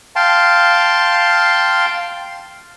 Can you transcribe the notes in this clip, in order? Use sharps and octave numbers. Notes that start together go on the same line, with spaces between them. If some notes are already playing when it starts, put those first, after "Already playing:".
F5 G5 A5 C6